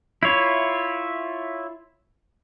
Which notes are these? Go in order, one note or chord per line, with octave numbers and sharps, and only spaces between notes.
E4 F4 C#5